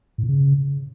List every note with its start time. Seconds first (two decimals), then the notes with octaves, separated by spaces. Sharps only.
0.18 A2
0.23 A#2
0.29 C#3